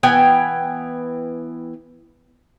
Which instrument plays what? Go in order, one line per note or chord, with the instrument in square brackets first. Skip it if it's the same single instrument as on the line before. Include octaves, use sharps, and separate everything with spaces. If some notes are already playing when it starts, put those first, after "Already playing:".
[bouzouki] E3 B3 G5 G#5